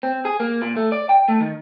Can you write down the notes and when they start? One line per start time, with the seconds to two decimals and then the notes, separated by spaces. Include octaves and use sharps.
0.03 C4
0.25 G#4
0.40 A#3
0.62 A#2
0.76 A3
0.92 D5
1.09 G5
1.28 A3
1.40 D#3